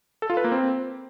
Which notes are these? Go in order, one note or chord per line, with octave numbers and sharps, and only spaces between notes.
A4
F4
B4
A#3
C4